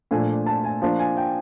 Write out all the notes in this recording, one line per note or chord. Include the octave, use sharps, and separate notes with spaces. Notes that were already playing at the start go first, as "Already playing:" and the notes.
A#2 F3 A3 D4 G#5
A5
G#5
F3 A#3 D4 A5
G#5
G5